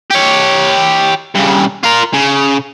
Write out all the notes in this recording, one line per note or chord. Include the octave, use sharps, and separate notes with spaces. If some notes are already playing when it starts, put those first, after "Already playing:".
G4 C#5
G2 C#3
F4 A#4
C#3